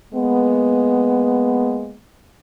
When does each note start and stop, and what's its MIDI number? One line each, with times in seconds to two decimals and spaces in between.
0.13 1.97 56
0.13 1.97 58
0.13 1.97 59